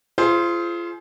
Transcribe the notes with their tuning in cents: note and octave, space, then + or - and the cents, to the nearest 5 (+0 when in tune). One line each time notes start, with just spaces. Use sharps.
F4 -30 G#4 +35 C5 +0